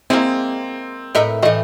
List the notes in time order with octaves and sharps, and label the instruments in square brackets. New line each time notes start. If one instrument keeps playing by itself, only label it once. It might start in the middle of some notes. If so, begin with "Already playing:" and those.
[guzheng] G#3 [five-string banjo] A#3 E4 [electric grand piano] C4
[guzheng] A2 B4 G5 [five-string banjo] A#4 D#5 E5
[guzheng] A2 E3 [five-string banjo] G3 A3 D#5